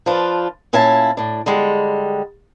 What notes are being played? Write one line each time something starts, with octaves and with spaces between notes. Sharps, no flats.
F3 D4 F4 B4
A#2 C#4 E4 C#5 F5 A5
A2 D4
D3 G3 G#3